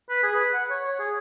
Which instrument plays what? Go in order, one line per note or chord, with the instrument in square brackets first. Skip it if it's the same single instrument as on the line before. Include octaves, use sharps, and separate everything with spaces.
[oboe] B4
G#4
B4
F#5
C#5
C#5
G#4